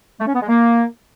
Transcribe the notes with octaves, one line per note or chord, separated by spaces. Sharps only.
A3
C#4
B3
G#3
A#3